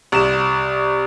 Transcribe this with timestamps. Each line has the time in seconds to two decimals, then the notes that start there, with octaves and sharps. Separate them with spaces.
0.12 C2 E7